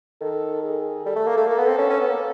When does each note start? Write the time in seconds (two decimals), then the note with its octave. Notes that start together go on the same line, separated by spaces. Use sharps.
0.21 D#3 A4
0.63 G#4
1.05 G3 A4
1.16 A3
1.27 A#3
1.37 A3
1.47 A#3 A4
1.58 B3
1.68 C4
1.78 C#4
1.90 C#4
2.01 B3
2.10 A#3